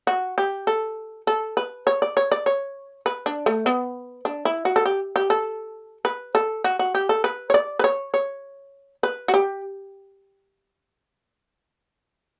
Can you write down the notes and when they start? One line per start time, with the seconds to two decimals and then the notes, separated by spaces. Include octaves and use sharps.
0.07 F#4
0.38 G4
0.67 A4
1.27 A4
1.57 B4
1.87 C#5
2.02 D5
2.17 C#5
2.31 D5
2.46 C#5
3.06 B4
3.26 D4
3.46 A3
3.66 B3
4.25 D4
4.45 E4
4.65 F#4
4.76 A4
4.85 G4
5.16 G4
5.30 A4
6.05 B4
6.35 A4
6.64 F#4
6.79 F#4
6.95 G4
7.09 A4
7.24 B4
7.50 C#5
7.54 D5
7.79 B4
7.84 C#5
8.14 C#5
9.03 B4
9.28 F#4
9.34 G4